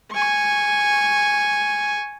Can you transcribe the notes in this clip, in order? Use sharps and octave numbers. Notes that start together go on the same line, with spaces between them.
G#5 C#6